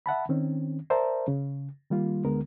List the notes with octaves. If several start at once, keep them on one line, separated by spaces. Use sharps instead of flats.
E5 F#5 A5 B5
D#3 C4 C#4
A#4 C5 D5 E5 A5 A#5
C#3
D#3 G3 A#3 F4
D2 D3 G#3 B3 A#4